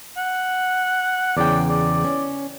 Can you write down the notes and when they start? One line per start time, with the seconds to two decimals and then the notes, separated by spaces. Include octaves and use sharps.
0.17 F#5
1.37 E2 C#3 D5 G5
1.69 D5
2.04 C#4